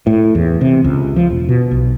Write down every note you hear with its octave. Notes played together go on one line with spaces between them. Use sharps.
A2
E2
C3
C#2
F3
E1
B2
B1